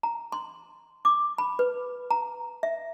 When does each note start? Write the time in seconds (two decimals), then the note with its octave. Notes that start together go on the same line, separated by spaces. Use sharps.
0.03 A#5
0.32 C6
1.05 D6
1.38 B5
1.59 B4
2.11 A#5
2.63 E5